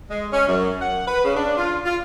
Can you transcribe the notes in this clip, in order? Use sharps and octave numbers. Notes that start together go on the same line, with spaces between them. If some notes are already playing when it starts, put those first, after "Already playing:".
G#3
C#4
F#2
F#5
B4
C#3
D4
F4
F4